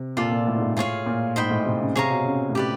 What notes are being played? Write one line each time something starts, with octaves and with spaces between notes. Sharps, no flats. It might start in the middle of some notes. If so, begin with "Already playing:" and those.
Already playing: C3
A#2 F4 A4 D5
A#2
A2
G#2
A2
A2 F4 G#4 C#5 F5
A#2
G#2 C5 D#5 G5 B5
A2
C3
C#3
C3 G#4 C#5 F5 A#5
B2
C#3
A2
G4 B4 D5